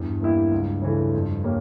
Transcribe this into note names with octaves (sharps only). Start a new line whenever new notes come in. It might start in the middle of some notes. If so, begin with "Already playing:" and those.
Already playing: E2 G2
E3 A#3 E4 G4
C#2
C#3 E3 A3
F2
G3 A#3 C#4